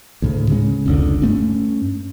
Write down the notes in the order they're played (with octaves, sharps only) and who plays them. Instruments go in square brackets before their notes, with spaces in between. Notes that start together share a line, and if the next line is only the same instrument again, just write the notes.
[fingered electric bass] D2 A2 C#3
C#3 G#3 C#4
F1 C#2 D3
G2 A3 C#4